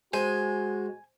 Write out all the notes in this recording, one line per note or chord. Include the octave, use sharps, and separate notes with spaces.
G#3 F#4 C5 G#5